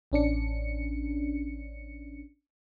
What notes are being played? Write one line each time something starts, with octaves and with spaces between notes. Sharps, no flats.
A1 C#4 D4 C#7